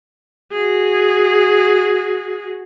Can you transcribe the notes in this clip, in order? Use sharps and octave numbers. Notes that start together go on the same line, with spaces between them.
F#4 G#4